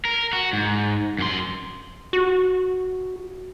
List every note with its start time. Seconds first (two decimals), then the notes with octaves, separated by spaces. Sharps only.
0.05 A#4
0.33 F#4
0.53 G#2
1.19 F#2 C6
2.13 F#4